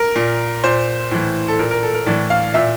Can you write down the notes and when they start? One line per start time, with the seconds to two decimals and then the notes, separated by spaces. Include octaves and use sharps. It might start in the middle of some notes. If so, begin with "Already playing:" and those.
Already playing: A#4
0.16 A#2
0.64 A#2 C5
1.11 A2 E3
1.48 A4
1.59 A#2 A#4
1.71 A#4
1.83 A4
1.95 A#4
2.06 A2 E3 D5
2.30 F5
2.54 A#2 E5